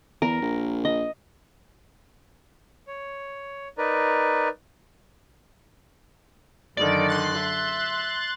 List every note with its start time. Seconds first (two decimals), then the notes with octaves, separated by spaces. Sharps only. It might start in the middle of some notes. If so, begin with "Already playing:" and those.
0.22 E2 A#4
0.42 A#1
0.85 D#5
2.87 C#5
3.78 D#4 A#4 B4 D5
6.77 F#2 D3 D#3 D5
7.09 C6 F#6 A6
7.39 E5